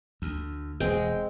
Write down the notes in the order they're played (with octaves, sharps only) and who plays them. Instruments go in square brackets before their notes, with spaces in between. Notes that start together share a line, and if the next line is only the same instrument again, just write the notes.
[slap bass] D2
[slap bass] E1 [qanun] G#3 C4 G5